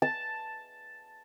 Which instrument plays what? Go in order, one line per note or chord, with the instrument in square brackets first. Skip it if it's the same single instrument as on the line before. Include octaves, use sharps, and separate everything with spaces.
[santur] A5